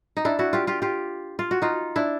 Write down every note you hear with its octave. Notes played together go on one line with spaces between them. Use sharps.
D#4
D4 E4
E4 F#4
F4 G4
F4 G4
F4 G4
F4
F#4
D#4 F4
D4 E4